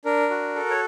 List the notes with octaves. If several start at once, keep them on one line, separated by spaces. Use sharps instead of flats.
D4 A#4
F#4
A4
C#5